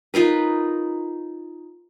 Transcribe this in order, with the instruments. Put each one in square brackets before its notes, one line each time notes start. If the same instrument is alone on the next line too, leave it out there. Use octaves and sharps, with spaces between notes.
[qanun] D#4 F4 A#4 B4